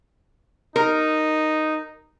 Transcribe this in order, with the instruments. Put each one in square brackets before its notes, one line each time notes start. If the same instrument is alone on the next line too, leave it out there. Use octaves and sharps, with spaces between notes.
[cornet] D#4 [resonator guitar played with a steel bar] A#4